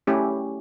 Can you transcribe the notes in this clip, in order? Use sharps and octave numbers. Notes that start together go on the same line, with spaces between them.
A3 C#4 E4 G4